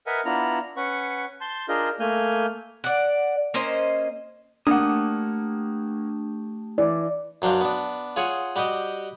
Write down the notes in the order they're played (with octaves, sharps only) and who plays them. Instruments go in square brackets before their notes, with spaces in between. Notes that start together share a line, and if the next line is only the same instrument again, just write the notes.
[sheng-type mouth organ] A#4 B4 D#5 E5 F#5 G#5
B3 D4 E4 F4 A#5
C#4 B4 F#5 C#6
A5 C6 G6
D4 F4 G#4 A#4 D#5 G6
A3 A#3 G#5 F6 G6
[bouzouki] D5 F#5
A#3 C#4 C5 D#5
[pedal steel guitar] A3 G4 D#6 [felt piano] A#3 F#5 [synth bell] D4
[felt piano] E3 [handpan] D5
[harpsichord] F#2 F#3 D4 C5 F5
B3 D4
F4 G#4 C#5 F#5 G#5
G3 F#4 G4 D#5